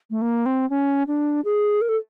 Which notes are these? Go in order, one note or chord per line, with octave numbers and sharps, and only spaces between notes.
A3
A#3
C4
C#4
D4
G#4
A#4
A4